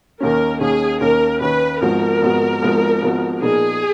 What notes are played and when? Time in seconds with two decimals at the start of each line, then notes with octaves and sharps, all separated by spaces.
0.20 D#2 D#3 A#3 C#4 A#4
0.61 D#2 D#3 A#3 C#4 G#4
1.00 D#2 D#3 A#3 C#4 A#4
1.40 D#2 D#3 A#3 C#4 B4
1.81 G#1 G#2 F3 B3 F#4 A#4
2.22 G#1 G#2 F3 B3 F#4
2.62 G#1 G#2 F3 B3 F#4
3.02 G#1 G#2 F3 B3 F#4
3.42 A#2 F3 B3 D#4 G#4